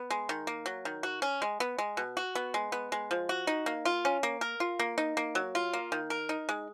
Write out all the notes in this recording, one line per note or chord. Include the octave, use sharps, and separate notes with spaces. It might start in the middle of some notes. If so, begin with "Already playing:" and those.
Already playing: B3
G#3
D#3
A#3
F#3
D#3
F#4
C#4
G#3
B3
G#3
B2
F#4
B3
G#3
B3
G#3
F3
F#4
D#4
A#3
F4
C#4
A#3
A#4
F4
A#3
D#4
A#3
F#3
F4
A#3
D#3
A#4
D#4
G#3